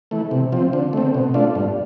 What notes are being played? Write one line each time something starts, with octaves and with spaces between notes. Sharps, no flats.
E3 A3
C3
F3 C4
D3
A3 C4
B2
A3 D4 F4
G2